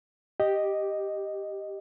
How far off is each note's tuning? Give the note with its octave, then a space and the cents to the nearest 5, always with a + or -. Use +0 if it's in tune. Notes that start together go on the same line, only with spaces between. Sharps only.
G4 +0 D#5 +0